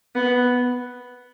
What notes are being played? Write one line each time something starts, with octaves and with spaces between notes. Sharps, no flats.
B3